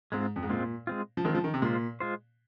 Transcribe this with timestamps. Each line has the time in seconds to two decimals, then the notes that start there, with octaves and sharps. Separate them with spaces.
0.12 G#2 G#3 C4 F4
0.36 F2
0.43 G#2
0.49 A#2 G#3 C4 F4
0.87 G#3 C4 F4
1.17 F3
1.25 D#3 G#3 C4 F4
1.35 F3
1.44 D#3
1.54 C3
1.62 A#2 G#3 F4 C5
2.00 G#3 F4 C5